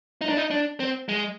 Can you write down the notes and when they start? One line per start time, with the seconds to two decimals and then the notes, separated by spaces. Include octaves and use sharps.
0.21 D#4
0.29 D4
0.37 D#4
0.51 D4
0.80 C4
1.09 G#3